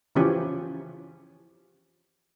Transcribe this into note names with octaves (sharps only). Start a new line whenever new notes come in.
C#3 E3 F3 C#4 G4